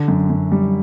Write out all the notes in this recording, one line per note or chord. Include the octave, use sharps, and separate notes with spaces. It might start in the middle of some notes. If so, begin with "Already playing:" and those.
Already playing: D3
F#2
F#2
G3